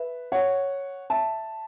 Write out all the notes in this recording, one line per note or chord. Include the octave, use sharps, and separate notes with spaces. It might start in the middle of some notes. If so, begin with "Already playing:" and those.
Already playing: B4 E5
C#5 F#5
E5 A5